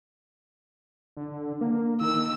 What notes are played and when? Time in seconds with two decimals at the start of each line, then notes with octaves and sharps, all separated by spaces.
1.17 D3
1.61 A#3
2.01 D#3 E6